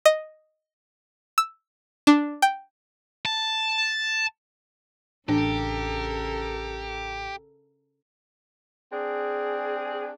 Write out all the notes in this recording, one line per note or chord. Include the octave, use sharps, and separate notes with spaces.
D#5
E6
D4
G5
A5
A1 C#3 D4 G4 A4 A#4
C4 D4 G#4